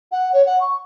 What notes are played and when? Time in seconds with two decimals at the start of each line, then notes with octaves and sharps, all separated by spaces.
0.12 F#5
0.33 C#5
0.46 F#5
0.60 C#6